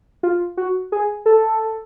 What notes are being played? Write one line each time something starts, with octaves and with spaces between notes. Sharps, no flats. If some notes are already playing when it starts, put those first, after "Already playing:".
F4
F#4
G#4
A4